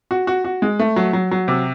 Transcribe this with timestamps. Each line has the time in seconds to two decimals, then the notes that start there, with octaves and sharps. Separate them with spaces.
0.11 F#4
0.27 F#4
0.45 F#4
0.62 G#3
0.79 A3
0.96 F#3
1.13 F#3
1.31 F#3
1.48 C3